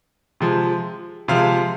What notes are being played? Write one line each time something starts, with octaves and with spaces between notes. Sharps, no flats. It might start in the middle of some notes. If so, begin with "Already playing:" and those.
C3 F3 G#3
C3 F3 G#3 F5